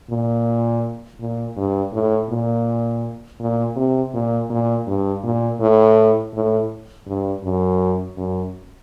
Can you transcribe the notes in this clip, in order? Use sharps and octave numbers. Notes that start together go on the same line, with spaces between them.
A#2
A#2
G2
A2
A#2
A#2
C3
A#2
A#2
G2
A#2
A2
A2
G2
F#2
F#2